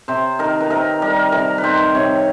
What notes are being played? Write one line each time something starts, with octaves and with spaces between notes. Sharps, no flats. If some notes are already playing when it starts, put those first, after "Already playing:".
C3 C5
D#3 A#4
B4
C3 A#4
G3 A#4
C3 A#4
B4
D#3 C5
C3 C#5